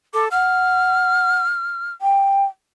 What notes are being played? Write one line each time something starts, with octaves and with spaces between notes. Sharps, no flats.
A4 D6
F#5 F6
G5